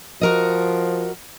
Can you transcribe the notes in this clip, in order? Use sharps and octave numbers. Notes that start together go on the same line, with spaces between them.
F3 F#4 A#4 D#5